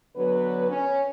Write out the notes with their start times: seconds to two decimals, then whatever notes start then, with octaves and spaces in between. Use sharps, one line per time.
0.16 D3 F#3 B3 C#4 B4
0.69 C#4